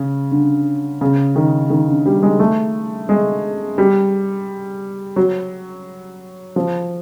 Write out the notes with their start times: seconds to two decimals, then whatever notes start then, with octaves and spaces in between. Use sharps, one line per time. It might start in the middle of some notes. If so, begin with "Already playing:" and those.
Already playing: C#3
0.32 D3
1.01 C#3
1.36 D#3
1.70 D#3
1.87 D3
2.06 G3
2.23 G#3
2.40 A3
3.09 G#3
3.78 G3
5.16 F#3
6.56 F3